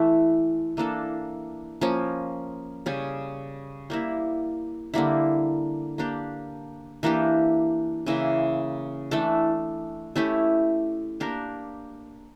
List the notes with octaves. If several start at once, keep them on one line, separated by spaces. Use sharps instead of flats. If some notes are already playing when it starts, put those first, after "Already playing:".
Already playing: E3 A3 E4
E3 A#3 D4 A4
F3 A#3 C#4
C#3 G3 C#4
G3 A#3 E4
D3 G3 A#3 E4
A#3 D4 G4
E3 A#3 D4 G4
C#3 E3 A#3 E4
E3 A3 D4 A4
A3 C#4 E4 G4
A#3 D4 G4 A#4